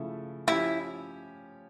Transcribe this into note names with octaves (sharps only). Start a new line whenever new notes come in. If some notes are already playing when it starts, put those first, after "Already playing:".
Already playing: C#3 F3 A3 E4
F3 C#4 E4 G4